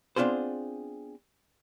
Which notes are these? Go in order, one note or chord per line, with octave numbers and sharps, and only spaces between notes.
B3 C4 D4 F4 G#4 C5